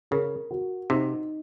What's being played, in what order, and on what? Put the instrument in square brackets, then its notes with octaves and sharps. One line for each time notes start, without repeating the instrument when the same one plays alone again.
[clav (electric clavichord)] C#3 [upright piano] A#4
[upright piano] F#4
[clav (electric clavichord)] C3 [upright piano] D#4